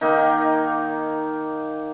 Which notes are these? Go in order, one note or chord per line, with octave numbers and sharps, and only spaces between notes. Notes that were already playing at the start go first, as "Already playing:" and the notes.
D#3 A#3 D#4